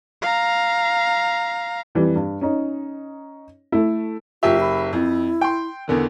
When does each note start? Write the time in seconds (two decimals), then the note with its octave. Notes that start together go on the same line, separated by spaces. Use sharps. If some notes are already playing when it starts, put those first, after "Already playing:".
0.22 F5 A#5
1.95 F2 E3 G3
2.16 G2
2.41 C#4 D#4
3.72 A3 E4
4.43 F#1 F4 G4 E5
4.61 B5
4.93 F2 E4
5.41 G5 C6
5.88 E2 D3 D#3